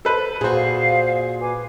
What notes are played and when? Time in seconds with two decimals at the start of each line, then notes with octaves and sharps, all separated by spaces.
0.05 A4 B4 C5
0.41 A#2 F#4 G#4 C5
0.53 F5
1.40 B4 G#5 D6